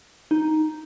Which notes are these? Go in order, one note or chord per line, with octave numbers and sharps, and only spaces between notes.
D#4